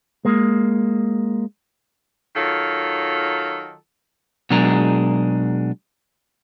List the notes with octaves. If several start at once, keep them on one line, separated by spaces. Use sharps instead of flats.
G#3 A#3
D#3 F#3 F4 A4
B2 F#3 G#3 D4 G#4 A#4